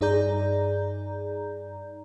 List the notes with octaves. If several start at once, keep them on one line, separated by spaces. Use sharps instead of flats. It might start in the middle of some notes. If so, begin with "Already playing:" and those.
G2 D#4 G#4 D5 A#5 G6